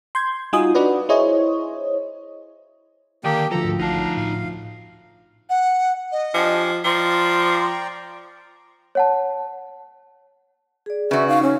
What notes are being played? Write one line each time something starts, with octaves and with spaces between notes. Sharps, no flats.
C6 G6 G#6
G3 D#4 F4 F#4 G#5 D#6
D4 F#4 B4 D5 D#5
E4 G#4 C5 C#5 D#5
D3 D#3 A#3 G4 G5 D#6
D2 F3 A4 A#5
G#2
A#1 D#4 F5 F#5 A5 A#5
A2 F5
F#5
D#5
F3 D4 G4 G#5
F3 D5 G5 A#5 C6
C#5 F#5 A5
G#4 D5
C#3 F#4 B4 D5 E5
D#4 F5
C#4